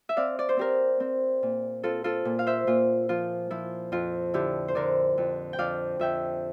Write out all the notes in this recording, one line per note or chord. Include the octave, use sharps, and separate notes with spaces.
E5
C4 D5 F5
D5
C5
C4 G4 A#4
C4
A#2
C4 F4 A4
F4 A4
A#2
F5
C5 E5
A#2 F4
F3 F4
F3 E4
F2 F4
D3 E4 G4
C5
D3 A#4 D5
F2
G5
F2 D5 F5
F2 E5 G5